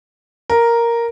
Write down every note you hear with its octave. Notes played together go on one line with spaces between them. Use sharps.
A#4